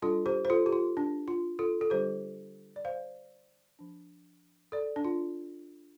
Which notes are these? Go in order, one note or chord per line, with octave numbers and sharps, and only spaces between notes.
G3 D4 F4 A4
G4 C5
C5
F4 A4
G4
F4
D4
F4
F4 A4
A4
D3 G3 D4 G4 C5
D5
C5 F5
F3 D4
A4 D5
D4
F4